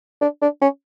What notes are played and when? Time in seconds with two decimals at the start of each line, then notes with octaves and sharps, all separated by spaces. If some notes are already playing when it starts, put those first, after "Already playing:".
0.21 D4
0.42 D4
0.61 C#4